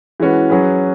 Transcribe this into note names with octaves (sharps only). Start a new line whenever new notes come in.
E3 G#3 C#4 F#4 B4
F#3 C#4 G#4 B4